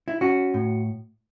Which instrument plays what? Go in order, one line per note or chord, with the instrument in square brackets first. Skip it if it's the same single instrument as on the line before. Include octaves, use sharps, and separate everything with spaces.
[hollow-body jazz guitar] E4
C#4 F#4
A2